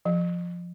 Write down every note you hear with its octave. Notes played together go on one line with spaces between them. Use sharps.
F3